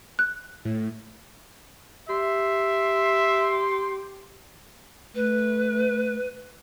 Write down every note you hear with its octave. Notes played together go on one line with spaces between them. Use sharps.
F#6
A2
G4 E5 C6
A3 B4